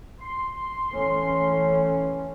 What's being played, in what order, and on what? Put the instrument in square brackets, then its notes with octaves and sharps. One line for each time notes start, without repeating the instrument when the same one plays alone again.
[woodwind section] C6
[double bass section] E3 A3 C#4